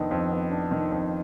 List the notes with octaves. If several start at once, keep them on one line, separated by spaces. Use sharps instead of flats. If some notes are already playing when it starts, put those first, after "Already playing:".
Already playing: F2 D#3 B3 D4
F2
B3
D4
D#3
F2